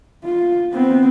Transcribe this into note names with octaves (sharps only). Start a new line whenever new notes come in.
F4
B3 C4